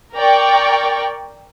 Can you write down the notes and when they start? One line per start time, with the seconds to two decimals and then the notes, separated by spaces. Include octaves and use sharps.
0.16 A#4 D5 G5 C#6